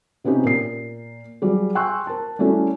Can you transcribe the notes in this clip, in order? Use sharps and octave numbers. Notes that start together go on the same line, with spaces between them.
C3 B3 C#4 D#4 G4
A#2 A#4 C7
F#3 G3 G#4
G5 G#5 C6 C#6 E6 F#6
A#4 A5
G3 A3 C#4 E4 F#4